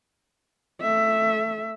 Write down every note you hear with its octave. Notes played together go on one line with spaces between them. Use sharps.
A3 E5